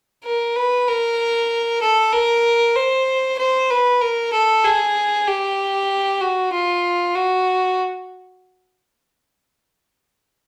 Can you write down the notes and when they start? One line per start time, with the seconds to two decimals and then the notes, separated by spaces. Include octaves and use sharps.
0.25 A#4
0.56 B4
0.88 A#4
1.82 A4
2.12 A#4
2.75 C5
3.38 C5
3.70 B4
4.01 A#4
4.32 A4
4.64 G#4
5.27 G4
6.21 F#4
6.52 F4
7.15 F#4